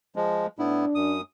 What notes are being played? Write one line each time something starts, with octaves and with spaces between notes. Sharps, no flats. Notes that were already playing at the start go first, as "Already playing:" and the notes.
F3 G#3
A2 B3 D4 E4
F#2 D#6